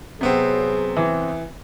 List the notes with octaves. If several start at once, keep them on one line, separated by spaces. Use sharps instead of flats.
C3 F#3 B3 C4 G#4
E3